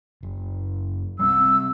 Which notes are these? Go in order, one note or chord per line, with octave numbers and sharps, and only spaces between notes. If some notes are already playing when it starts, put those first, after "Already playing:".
F#1
G3 A#3 C4 E6